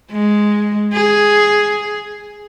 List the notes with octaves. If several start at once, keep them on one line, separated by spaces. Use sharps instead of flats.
G#3
G#4